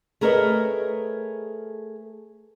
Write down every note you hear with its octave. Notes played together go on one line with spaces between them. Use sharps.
A3 G#4 A#4 B4 C#5 D#5